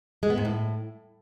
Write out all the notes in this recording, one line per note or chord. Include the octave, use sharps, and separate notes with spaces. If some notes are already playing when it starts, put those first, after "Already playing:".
G#3
B3
G#2
A2